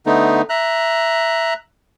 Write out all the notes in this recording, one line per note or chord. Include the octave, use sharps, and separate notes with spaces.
D3 A3 B3 D#4
E5 A#5 F#6